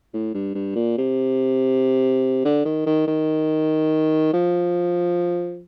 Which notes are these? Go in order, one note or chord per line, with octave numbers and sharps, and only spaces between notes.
A2
G2
G2
A#2
C3
D3
D#3
D#3
D#3
F3